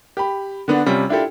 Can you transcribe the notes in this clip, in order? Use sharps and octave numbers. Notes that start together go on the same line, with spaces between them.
G4 B5
D3 B3 D4
C3 G3 C#4 F4
D4 E4 F4 G4 A4